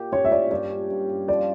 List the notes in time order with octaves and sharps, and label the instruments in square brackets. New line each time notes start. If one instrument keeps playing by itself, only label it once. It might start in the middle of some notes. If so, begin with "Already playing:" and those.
Already playing: [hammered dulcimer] A#2 G4
[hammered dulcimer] C#4 [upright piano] C#5
[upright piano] E5
[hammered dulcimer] C#4 [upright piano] D5
[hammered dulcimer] G2 [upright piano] D5
[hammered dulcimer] C#4
G2
G2
[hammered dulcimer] F3 [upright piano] D5